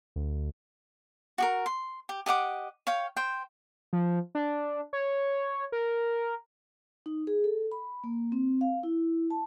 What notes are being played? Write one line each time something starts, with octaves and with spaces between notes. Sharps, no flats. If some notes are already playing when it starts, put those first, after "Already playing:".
D2
F#4 G4 A#4
C6
G4
G4 D#5 F#5 D6
C#5 F5 G5
C5 G5
F3
D4
C#5
A#4
D#4
G#4
A4
B5
A#3
C4
F5
E4
A5